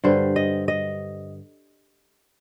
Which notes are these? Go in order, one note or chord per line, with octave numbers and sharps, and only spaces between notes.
G2 D3 G3 C5
D#5
D#5